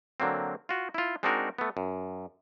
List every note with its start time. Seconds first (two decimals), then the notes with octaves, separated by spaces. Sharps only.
0.20 D3 F#3 A#3 C4
0.69 F4 F#4
0.94 E4 F4
1.23 G#3 C4 D4 D#4 F#4 A#4
1.58 A3 B3
1.77 F#2